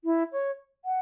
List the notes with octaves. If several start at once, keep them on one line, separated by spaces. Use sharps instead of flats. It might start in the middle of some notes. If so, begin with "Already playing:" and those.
E4
C#5
F#5